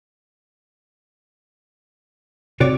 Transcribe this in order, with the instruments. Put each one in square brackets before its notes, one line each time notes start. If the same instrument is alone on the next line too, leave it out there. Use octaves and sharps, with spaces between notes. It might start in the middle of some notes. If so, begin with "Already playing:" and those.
[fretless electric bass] C3 [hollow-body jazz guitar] F#4 C#5 D5